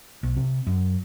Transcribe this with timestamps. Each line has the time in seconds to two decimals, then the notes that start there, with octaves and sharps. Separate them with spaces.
0.23 B1
0.37 C3
0.67 F#2